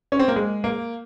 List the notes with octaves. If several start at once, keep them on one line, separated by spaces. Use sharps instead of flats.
C#4
C4
A#3
G#3
A#3